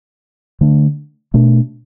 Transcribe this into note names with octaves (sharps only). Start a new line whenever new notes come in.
D3 A3 D4
B2 A3 D4